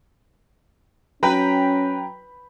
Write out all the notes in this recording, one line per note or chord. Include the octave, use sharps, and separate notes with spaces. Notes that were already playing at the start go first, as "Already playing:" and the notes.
F#3 C#4 B4 G5 A#5